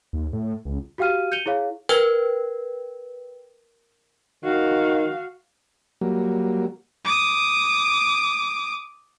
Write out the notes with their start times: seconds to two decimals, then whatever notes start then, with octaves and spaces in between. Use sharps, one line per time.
0.13 D#2
0.33 A2
0.65 C#2
0.98 F#4 G4 F5 G5 F6 D#7
1.32 G6 C#7 D#7 F7 G7
1.46 E4 G#4 C#5 F5
1.89 A#4 B4 G5 G#6
4.44 D#3 F#4 F5
6.01 F#3 G3 A#3
7.04 D6 D#6